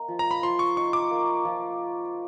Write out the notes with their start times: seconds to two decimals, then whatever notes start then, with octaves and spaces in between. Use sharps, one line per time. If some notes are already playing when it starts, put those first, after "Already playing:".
Already playing: A#3 D#4
0.08 F3
0.19 A#5
0.31 B5
0.43 F3 C6
0.59 C#6
0.77 D#4 C#6
0.93 D6
1.11 A#3
1.45 F3